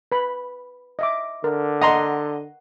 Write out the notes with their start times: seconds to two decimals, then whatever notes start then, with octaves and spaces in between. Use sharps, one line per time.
0.12 B4 B5
0.99 D#5 E5 D6
1.44 D3 A#4
1.81 D#5 F#5 A#5 C6